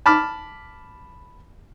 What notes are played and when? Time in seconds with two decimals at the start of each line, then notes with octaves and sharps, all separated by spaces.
0.06 A5 B5 D6 F6